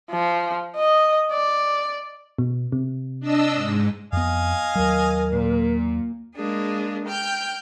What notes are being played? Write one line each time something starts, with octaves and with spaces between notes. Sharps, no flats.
F3
D#5
D5
B2
C3
D4 D#5 E6
G#2
F2 B3 D#5 F5 G#5
D#2 F#3 A#4
A#2
G#3 A#3 D4 G#4
G5 F6 G6